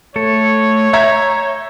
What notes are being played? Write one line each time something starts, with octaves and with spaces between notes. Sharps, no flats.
A3 A4 C#5
E5 A#5 G6 G#6